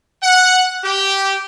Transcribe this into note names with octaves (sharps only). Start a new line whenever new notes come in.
F#5
G4